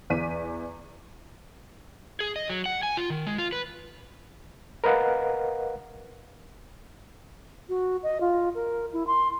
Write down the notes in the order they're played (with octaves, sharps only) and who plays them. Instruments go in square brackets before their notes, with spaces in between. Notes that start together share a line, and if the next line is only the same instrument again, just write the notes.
[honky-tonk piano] E2 D5 B6 D#7
[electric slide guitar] G#4
D#5
F#3
F#5
G#5
F4
D#3
G#3
F4
B4
[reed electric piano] A#4 B4 D#5 F5 F#5
[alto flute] F#4
D#5
F4
A#4
E4
C6